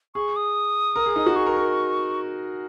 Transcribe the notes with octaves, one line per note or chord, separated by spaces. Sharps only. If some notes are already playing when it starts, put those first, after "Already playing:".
G#4 C#6
D#6
A#4
G#4
D#4
F#4
G#4 C#6
A#4
A#4